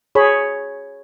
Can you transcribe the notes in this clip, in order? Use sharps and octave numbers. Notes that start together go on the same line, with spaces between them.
G#4 C#5 B5